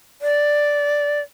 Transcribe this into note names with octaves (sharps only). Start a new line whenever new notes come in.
D5